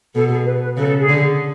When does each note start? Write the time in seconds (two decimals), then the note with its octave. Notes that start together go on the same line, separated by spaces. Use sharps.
0.14 B2 A4
0.30 G#4
0.45 B4
0.61 B4
0.77 C#3 A4
0.87 A4
0.99 G#4
1.09 D3